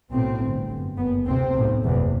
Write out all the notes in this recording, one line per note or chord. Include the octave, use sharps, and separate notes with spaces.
B1 A2 C4
G1 G2
G1 F#2
F#1 F#2 B3
D2 C3 C4
B1 A2
F#1 E2 C3